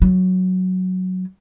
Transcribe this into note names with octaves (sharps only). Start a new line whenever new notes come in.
F#3